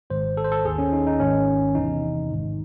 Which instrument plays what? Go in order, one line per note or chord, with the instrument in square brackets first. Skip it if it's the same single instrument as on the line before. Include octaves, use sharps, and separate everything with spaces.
[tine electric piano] G#1 G#2 D#3 C5
A4
C5
A4
D#2 D#3 G#4
C#4
D#4
D#4
G#1 G#2 D#3 C#4
E2 C3 E3 D#4
A1 G#2 D#3